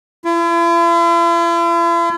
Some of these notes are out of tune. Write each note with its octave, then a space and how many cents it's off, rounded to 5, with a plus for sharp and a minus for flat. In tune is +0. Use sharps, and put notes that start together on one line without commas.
E4 +45